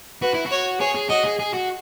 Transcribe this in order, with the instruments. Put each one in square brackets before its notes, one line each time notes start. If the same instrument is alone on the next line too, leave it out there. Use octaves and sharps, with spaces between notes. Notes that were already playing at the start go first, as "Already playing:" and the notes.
[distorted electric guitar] F#4 [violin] B4
[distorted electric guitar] E4
F#4
[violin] C#5
[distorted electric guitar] G#4 [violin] C#5
[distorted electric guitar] G#4
[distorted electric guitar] F#4 [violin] D#5
[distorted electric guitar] G#4
G#4
F#4